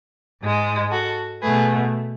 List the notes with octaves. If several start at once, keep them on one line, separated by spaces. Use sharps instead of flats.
G#2 G#3
F#4 A4
B2 A3 G#4 B4